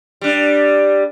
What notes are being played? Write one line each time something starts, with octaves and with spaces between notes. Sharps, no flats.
G3 D4